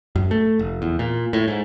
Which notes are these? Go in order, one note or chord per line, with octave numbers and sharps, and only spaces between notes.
F#2
A3
F1
E2
A#2
A2
G#2